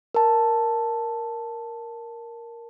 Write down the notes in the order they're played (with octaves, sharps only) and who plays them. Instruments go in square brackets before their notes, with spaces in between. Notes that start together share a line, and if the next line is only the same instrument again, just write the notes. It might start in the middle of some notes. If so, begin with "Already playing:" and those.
[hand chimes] A#4 A5